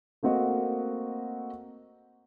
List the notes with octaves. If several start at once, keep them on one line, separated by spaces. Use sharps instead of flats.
A3 A#3 C4 F#4 D#5